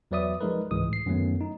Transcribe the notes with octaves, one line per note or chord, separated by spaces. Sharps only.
E2 F#3 B4 D5 E5 D#6
F3 G#3 D#4 A#4 B4
C#2 G#2 E3 G#3 D#6
A2 C7
F#2 D#3 F#3 A3 B3
D#4